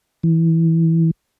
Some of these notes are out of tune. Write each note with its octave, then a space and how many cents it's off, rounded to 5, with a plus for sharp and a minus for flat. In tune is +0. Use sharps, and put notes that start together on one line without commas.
E3 -10